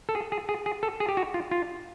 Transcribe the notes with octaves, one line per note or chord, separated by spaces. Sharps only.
A4
G#4
G#4
G#4
G#4
A4
G#4
G4
F#4
F4
F4